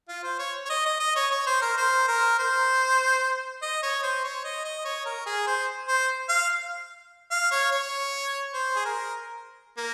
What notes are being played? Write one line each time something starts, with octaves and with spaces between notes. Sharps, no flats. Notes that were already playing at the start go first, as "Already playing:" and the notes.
F4
C5
C#5
C#5
D#5
D#5
D#5
C#5
C#5
C5
A#4
C5
A#4
C5
D#5
C#5
C5
C#5
D#5
D#5
C#5
A#4
G#4
C5
C5
F5
F5
C#5
C#5
C5
G#4
A#4
A#3